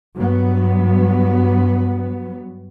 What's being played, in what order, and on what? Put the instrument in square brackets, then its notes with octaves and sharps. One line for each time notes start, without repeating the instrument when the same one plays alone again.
[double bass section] G2 F#3 B3